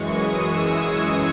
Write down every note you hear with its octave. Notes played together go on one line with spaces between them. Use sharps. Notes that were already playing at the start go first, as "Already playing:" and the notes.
Already playing: F#2 E3 G#3 C#6
D#6
E6
G#6